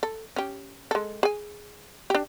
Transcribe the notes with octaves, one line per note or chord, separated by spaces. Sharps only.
A4
C#4 G4
G#3 A4
G#4 G#5
D4 G4